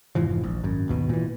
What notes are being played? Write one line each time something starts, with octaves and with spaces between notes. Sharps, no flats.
F1 G#2 E3 F3
A#1
G#1 F#2
G#1 D#2 B2
A#2 E3